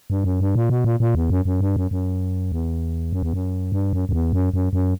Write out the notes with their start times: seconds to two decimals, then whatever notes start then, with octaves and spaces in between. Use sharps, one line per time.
0.10 G2
0.24 F#2
0.40 G2
0.55 A#2
0.70 B2
0.85 A#2
1.00 A#2
1.15 E2
1.30 F#2
1.45 F#2
1.61 G2
1.76 F#2
1.91 F#2
2.52 E2
3.13 F#2
3.23 E2
3.33 F#2
3.72 G2
3.93 F#2
4.09 F#2
4.13 E2
4.33 F#2
4.54 F#2
4.73 F#2